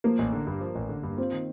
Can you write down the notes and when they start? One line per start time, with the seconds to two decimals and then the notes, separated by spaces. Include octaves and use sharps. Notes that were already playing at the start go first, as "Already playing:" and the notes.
0.04 F3 A#3
0.19 A1
0.33 D3
0.47 G2
0.61 F3
0.75 A1
0.89 D3
1.03 G2
1.18 C4 F4
1.32 D#3